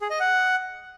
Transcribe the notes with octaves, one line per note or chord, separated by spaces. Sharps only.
G#4
D#5
F#5